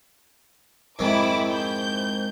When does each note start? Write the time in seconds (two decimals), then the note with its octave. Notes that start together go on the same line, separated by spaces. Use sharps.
0.99 F2 G#2 D#3 E4 D6
1.53 G6